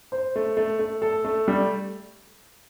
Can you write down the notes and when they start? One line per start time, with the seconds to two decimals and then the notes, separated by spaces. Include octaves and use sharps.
0.12 C5
0.36 A3
0.57 A3
0.79 A3
1.02 A4
1.25 A3
1.48 G3